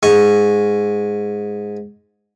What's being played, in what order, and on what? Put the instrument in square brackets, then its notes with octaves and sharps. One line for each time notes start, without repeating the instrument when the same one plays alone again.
[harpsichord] G#2 G#5 C#6